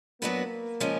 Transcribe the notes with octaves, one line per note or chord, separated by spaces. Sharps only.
F#3 A#3 B3 D4 F#4 B4
C#3 F3 G#3 C#4